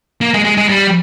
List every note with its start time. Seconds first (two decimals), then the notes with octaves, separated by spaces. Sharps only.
0.21 A#3
0.34 G#3
0.45 G#3
0.57 G#3
0.69 G3